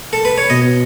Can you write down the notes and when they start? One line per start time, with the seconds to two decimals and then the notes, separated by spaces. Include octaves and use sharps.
0.13 A4
0.25 B4
0.38 C#5
0.50 B2 D#5